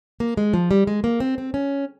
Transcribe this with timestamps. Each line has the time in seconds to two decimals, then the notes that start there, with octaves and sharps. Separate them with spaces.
0.20 A#3
0.37 G#3
0.54 F3
0.71 G3
0.87 G#3
1.04 A#3
1.20 C4
1.38 C4
1.54 C#4